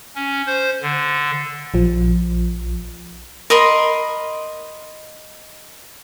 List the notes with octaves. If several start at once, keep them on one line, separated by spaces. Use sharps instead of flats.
C#4
C5
D3
A#1 F3
A#4 D#5 B5 C6